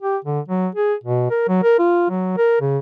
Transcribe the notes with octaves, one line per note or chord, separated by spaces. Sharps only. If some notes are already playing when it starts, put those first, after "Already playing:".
G4
D3
F#3
G#4
B2
A#4
F#3
A#4
F4
F#3
A#4
C#3